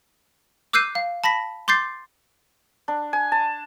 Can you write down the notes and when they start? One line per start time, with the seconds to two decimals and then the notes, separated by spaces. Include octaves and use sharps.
0.73 D6 E6 F#6 G6 C7 D#7
0.95 F5
1.24 A5 B5 A#6 B6
1.68 C6 D6 G6 A6 C7
2.88 D4
3.13 G#5
3.32 A5